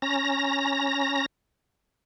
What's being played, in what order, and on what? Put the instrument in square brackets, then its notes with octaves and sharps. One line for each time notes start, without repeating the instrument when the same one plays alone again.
[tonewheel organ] C#4 A#5 A#6